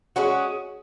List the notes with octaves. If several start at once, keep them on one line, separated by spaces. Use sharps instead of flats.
G#3 C#4 F#4